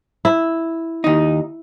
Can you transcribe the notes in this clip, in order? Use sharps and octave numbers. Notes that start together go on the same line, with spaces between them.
E4
D#2 D#4